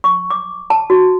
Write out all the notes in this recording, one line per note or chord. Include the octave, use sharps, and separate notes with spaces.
C#6
D6
A5
F#4